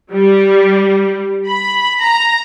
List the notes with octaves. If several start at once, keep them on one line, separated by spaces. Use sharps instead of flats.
G3
B5
A#5